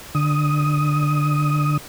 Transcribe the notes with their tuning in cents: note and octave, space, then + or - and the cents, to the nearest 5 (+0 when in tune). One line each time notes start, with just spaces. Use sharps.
D3 +15 D#6 +10